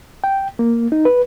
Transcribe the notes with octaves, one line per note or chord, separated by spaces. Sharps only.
G5
A#3
D#4
B4